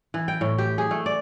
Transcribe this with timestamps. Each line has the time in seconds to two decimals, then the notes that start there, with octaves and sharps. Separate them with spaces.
0.14 E3
0.28 G5
0.41 A2
0.58 G4
0.78 G#4
0.91 A3
1.06 D5